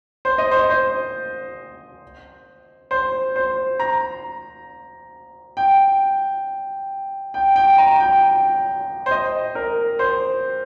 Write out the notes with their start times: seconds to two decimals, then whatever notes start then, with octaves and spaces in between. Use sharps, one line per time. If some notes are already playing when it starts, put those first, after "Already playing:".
0.25 C5
0.38 D#5
0.51 C5
0.70 C5
2.91 C5
3.36 C5
3.80 A#5
5.57 G5
7.34 G5
7.56 G5
7.78 A#5
8.00 G5
9.06 C5
9.11 D#5
9.55 A#4
9.99 C5